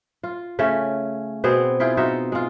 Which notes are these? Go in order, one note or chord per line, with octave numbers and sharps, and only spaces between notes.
F4
C#3 A3 C#4
B2 B3 C4 G#4
E4 F4 G#4 G5
D#4 F4 F#4 E5
G#3 F4